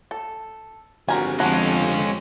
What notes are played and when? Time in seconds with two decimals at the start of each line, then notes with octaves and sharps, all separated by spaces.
0.11 A4
1.09 G#1 F2 D3 C4 F#4 G4 A#4 G#5
1.40 F2 G#3 C#4 A4 B4 F#5